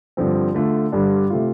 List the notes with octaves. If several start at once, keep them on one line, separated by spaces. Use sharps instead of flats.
G2 D3 F3 C4
D3 A3 F4
G2 D3 G3 D4
C3 A3 F4